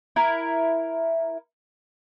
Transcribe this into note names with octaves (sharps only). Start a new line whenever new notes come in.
E4 A#4